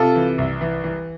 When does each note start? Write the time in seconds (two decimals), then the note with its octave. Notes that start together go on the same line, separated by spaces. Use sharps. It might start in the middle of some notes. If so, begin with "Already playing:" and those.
Already playing: C3 F4 A4
0.15 E3
0.38 C2
0.61 E3
0.84 E3